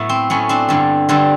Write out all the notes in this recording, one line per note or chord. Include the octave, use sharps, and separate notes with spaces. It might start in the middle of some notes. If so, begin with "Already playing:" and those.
Already playing: A2 F#3 B3 E4
C4
A2 F#3 B3 C#4
C4 D4
G2 D3 G3
G2 D3 G3 C4